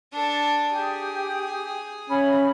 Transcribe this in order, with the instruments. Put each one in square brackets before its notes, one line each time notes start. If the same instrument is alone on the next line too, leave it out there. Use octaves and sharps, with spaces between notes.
[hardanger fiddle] D4 A4
[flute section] G4 D#6 [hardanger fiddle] G#4
[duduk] C#4 [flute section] E5 B5